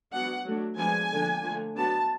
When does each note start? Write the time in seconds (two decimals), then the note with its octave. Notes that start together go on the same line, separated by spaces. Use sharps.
0.12 F#3 B3 D4 F#5
0.45 F#3 A3 D4
0.77 F3 G#3 B3 D4 G#5
1.11 D3 F3 A#3 D4
1.43 D3 F3 A3
1.75 F#3 B3 D4 A5